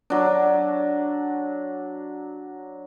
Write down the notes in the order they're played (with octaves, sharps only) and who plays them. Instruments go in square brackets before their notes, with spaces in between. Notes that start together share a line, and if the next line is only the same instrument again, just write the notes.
[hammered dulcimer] F#3 D4